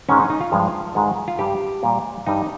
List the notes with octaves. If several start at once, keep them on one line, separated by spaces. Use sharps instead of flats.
G#2 D#3 G#3 C#4
D#4
D#4
F4
G2 F3 G#3
G#2 D#3 G#3
F4
G2 G3 G4
A#2 G3
G2 G3 D#4